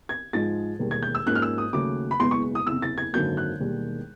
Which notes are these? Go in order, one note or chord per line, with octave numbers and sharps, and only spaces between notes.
G#6
G#2 F3 G#3 A6
E1 D#2 D#3 G3
G#6
G6
E6
G#2 F3 A#3 C#4 F#6
F6
E6
D#6
D#2 C#3 F#3 A3 D6
B5
F#1 E2 B2 G#3 B3 C6
C#6
D#6
F#1 E2 C3 E6
A6
G#6
G#1 F#2 D3 F#3 A#3 G6
F#6
E1 D#2 D#3 G3